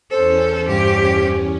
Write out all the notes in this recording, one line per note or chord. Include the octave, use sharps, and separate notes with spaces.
E2 C#4 A4 C5
G2 G4